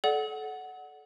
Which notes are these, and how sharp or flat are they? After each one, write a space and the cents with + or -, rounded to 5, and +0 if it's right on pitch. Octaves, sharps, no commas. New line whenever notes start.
A4 -30 D5 +0 F#5 +0